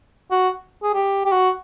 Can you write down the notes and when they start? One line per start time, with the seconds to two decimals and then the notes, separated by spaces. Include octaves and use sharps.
0.31 F#4
0.83 G#4
0.94 G4
1.26 G4
1.32 F#4